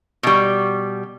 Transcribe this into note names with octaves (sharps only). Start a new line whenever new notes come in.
B2 G3